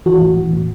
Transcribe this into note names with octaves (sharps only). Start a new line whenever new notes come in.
E3 F#4
A2
E3
A2